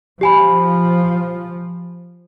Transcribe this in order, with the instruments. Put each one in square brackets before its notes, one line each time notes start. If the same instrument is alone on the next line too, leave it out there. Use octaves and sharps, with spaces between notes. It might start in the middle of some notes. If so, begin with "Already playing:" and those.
[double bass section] F3 [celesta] G4 G#5 B5